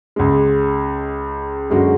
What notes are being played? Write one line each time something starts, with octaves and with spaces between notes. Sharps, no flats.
C#2 C#3 G#3
F#2 D3 G#3 C#4 F#4